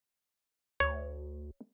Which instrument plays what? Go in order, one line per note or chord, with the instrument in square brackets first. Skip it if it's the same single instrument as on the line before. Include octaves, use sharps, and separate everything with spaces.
[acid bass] D2 [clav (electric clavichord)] C#5